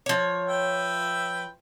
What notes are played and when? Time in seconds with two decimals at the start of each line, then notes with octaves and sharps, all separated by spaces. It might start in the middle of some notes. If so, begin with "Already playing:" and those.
0.06 F3 C#5
0.47 B4 E5 G5